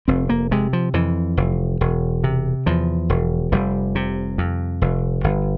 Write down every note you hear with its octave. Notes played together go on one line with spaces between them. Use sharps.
F1 C4
A#3
C3 G#3
F3
F2 E3
F1
E1
C3
E2 F3
E1
F1 G3
C3
F2
F1
G1